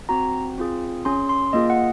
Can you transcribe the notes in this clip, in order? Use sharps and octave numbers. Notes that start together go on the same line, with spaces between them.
C4 F#4 A#5
C4 F4 G#4
C#4 G#4 C6
C6
A#3 F4 G#4 D#5
F#5